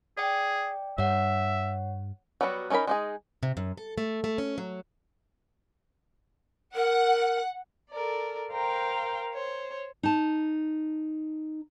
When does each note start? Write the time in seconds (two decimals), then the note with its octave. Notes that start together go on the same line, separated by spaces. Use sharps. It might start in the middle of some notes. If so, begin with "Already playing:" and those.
0.17 G#4 D5 G5
0.98 G2 C#5 E5 F#5
2.41 F#3 G3 B3 E4 F#4
2.70 A3 C#4 D#4 A#4 B5
2.87 G#3 D#4 G#4
3.43 C3
3.57 F#2
3.77 A4
3.98 A3
4.24 A3
4.38 C#4
4.58 F#3
6.75 A#4 F#5
7.90 A4 A#4 D5
8.52 A#4 C5 F5 G5 A#5
9.32 C5 C#5
10.03 D#4 A5